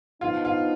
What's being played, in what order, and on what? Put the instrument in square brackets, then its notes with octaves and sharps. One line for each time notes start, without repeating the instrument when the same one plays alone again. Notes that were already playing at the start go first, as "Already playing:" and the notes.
[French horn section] F3 B3 D#4 [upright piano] F4
[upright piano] F4